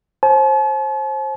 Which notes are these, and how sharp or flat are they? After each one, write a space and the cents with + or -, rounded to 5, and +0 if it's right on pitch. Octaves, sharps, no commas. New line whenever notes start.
C5 +30 A5 -45